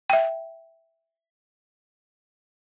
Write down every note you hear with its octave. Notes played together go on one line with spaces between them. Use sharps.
E5 G5